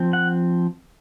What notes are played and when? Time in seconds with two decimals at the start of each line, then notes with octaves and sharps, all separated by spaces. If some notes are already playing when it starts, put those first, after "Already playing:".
Already playing: F3 C4
0.13 F#5